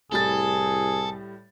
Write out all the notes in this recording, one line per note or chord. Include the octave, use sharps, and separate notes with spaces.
C2 A2 G3 G#4 A4 A6